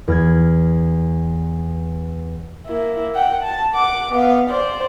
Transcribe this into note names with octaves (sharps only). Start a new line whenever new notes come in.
E2 F6 G#6
A#3 E4
F#5 G5
A5
F#5 D6
B3 F5
C5 D5